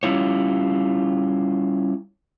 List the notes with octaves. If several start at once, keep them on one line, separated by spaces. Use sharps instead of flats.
G3 C#4 E4 F4 C#5